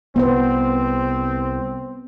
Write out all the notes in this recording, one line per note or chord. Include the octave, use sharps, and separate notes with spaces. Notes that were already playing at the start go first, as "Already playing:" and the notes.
C2 B3 C4 C5